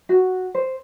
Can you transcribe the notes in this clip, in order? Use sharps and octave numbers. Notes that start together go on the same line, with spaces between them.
F#4
C5